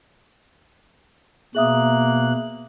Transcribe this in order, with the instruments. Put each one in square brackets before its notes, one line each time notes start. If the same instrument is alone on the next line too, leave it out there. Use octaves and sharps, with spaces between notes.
[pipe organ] B2 F#6 [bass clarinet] A#3 [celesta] G#4 E5 D#6